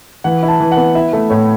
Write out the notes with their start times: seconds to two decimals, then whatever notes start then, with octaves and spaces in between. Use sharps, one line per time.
0.24 E3 F#5
0.43 E4
0.48 A5
0.60 E3
0.72 F#5
0.77 B3
0.95 E4 E5
1.13 A3
1.30 A2 C#5